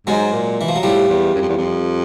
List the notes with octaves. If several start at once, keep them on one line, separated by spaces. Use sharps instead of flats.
G#2 F#3 G#3
A#2
E3
F3
F#3
A2 F3 G3
E2
F#2
F2
E2
F2